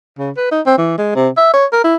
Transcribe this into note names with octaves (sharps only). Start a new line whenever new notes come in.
C#3
B4
D#4
C4
E3
G#3
C3
E5
C#5
A#4
E4